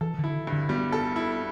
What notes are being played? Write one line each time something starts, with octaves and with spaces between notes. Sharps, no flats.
E3 A4
D3
E4
G2
D3
G3 B3
A4
E4